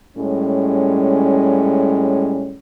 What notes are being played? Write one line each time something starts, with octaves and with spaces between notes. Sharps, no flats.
A2 G3 G#3 C#4